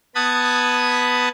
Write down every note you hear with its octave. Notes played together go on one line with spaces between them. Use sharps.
B3 A5 B5 D#6 F#6 G#6